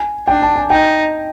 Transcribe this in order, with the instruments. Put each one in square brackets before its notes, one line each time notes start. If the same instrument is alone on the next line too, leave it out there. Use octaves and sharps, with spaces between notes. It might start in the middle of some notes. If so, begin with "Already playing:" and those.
Already playing: [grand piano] G#5
[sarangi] D4 [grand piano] G5
[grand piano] A5
G#5
[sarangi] D#4 [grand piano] G5